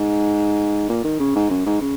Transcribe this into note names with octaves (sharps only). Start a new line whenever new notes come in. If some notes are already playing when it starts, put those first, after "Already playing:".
Already playing: G#2
A#2
D#3
C#3
G#2
F#2
G#2
C#3